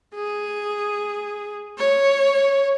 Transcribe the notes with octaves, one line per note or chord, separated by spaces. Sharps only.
G#4
C#5